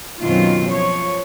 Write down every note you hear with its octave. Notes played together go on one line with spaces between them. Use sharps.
F#2 B2 D#3 C4 F4
F3 C#5